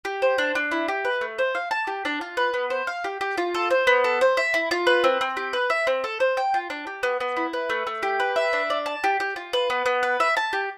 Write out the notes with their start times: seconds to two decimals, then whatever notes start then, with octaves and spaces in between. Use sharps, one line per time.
0.05 G4
0.22 C5
0.38 D4
0.55 D4
0.71 E4
0.88 G4
1.05 B4
1.21 A3
1.38 C5
1.55 F5
1.71 A5
1.87 G4
2.05 D4
2.21 F4
2.37 B4
2.54 B3
2.70 C5
2.87 F5
3.04 G4
3.21 G4
3.38 F4
3.54 A4
3.70 C5
3.87 B3
4.04 A4
4.21 C5
4.37 E5
4.54 E4
4.71 F4
4.87 B4
5.04 C4
5.21 C4
5.37 G4
5.53 B4
5.70 E5
5.87 C4
6.04 A4
6.20 C5
6.37 G5
6.54 F4
6.70 D4
6.87 G4
7.03 B3
7.20 B3
7.37 E4
7.53 B4
7.70 A3
7.87 A3
8.03 G4
8.20 B4
8.36 E5
8.53 D4
8.70 D5
8.86 A5
9.04 G4
9.20 G4
9.36 F4
9.53 B4
9.70 B3
9.86 B3
10.03 B4
10.20 E5
10.37 A5
10.53 G4